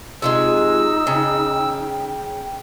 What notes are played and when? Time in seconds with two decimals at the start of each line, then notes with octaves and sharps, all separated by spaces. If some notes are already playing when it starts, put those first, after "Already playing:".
0.22 C3 F3 G#3 D#4 F4 E6
1.07 C#3 G5